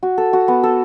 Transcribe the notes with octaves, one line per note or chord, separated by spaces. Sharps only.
F#4
A4
F#4
B3
A4